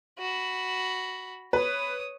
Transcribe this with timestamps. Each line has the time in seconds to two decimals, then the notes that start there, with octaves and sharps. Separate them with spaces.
0.18 F#4 B5
1.53 B4 C#5 D#6